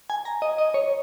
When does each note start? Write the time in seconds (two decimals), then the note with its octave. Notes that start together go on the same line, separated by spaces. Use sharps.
0.10 G#5
0.25 A#5
0.42 D#5
0.58 D#5
0.74 C#5